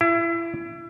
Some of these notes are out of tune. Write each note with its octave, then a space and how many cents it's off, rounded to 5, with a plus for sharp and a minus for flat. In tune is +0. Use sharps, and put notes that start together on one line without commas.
E4 +30